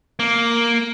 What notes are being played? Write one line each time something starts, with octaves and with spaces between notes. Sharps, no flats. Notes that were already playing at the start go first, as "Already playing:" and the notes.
A#3